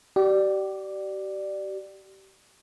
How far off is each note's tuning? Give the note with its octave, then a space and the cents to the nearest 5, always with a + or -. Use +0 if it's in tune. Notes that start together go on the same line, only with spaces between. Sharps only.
G4 -35 D5 +10